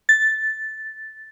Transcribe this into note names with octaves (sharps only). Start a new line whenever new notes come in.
A6